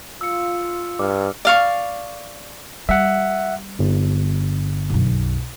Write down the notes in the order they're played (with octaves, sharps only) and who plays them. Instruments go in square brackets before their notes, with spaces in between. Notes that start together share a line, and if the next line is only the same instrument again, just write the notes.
[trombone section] F4 [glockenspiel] E6 C#7
[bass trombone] G2 [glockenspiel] D6 F6
[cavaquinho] D5 F5 C#6
[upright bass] G3 [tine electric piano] E5 F#5
[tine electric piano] G1
[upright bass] B1 F#2